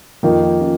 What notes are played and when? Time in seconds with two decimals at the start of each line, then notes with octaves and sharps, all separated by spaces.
0.23 F2 D#3 A#3 D#4 F4
0.41 F4
0.60 C#4 F4